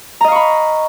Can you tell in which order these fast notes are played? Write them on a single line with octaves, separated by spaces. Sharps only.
A#5 D#5 F5 C#6 B5